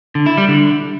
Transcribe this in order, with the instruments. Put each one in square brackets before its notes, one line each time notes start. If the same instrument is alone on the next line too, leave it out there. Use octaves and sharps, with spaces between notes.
[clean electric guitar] D3
E4
G3
D3